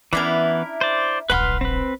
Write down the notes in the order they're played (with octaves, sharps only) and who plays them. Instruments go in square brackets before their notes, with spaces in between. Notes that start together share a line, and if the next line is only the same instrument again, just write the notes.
[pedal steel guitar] E3 B3 [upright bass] C#4 [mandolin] D4 E4 A#4
[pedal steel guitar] C5 D5
[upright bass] D1 A#1 [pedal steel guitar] B4 C6 F6 [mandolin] F#5 B5
[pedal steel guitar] C4 B4